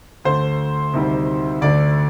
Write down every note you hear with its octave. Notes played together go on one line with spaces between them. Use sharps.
D2 D3 A3 C5
D2 C3 D#3 G3
D2 D3 A3 D5